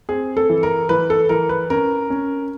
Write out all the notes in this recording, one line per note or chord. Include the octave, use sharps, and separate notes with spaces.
C4 G#4
A4
E3
A#4
E3 B4
A4
E3 A#4
B4
C#4 A#4
C#4